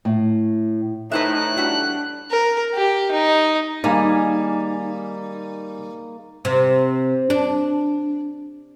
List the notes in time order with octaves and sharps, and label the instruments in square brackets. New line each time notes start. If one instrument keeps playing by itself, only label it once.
[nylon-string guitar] A2
[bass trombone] A2 [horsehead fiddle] D#4 [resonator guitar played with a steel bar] B4 C5 E5 [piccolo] F#6
[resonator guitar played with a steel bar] G3 E4 F#4 [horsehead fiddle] D4
[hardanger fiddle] A#4
G4
D#4
[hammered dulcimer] D#3 A#3 G#4 [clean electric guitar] G3 [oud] D#4 [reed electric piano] F5 G#5 A#5
[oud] C3
D4